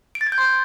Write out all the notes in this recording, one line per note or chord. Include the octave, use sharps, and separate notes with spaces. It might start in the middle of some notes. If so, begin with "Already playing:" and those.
D7
A6
G#6
G6
C6